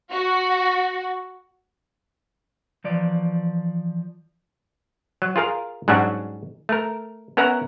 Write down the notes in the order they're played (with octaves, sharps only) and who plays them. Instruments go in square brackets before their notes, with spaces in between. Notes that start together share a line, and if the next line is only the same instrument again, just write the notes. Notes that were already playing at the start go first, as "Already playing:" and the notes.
[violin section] F#4
[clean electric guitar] E3 F3 D5
[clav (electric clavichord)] F#3
F4 G#4 A#4 F5
G#2 F#3 G3 C#4 D4 F#4
A3 A#4
B3 C#4 A#4 E5 F#5 A#5